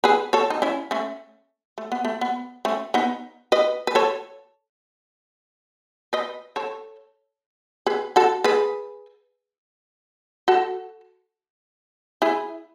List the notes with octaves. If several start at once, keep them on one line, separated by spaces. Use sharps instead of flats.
G#4 B4
A4 C#5
D#4
C#4 E4
A3 C#4
A3
B3
A3
B3
A3 C#4
B3 D#4
B4 D#5
B4
A4 C#5
B4 D#5
A4 C#5
G#4 B4
F#4 A4
G#4 B4
F#4 A4
E4 G#4